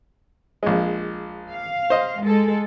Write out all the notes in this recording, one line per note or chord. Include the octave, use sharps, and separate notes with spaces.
A#1 G#3
F5
C5 D#5
G#3 A4